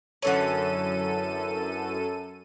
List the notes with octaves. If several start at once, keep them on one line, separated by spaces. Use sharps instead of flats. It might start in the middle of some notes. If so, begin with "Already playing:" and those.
F#2 D3 E3 C#4 A4 D#7